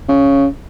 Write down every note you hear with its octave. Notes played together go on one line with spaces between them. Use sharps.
C#3